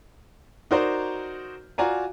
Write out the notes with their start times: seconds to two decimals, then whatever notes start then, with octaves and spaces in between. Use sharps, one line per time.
0.71 D#4 F#4 A#4 C5 D5
1.78 F4 F#4 D5 G#5 A#5